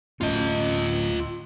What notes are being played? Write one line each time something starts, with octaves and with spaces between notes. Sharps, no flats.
D1 A3 C#4 F4 D#5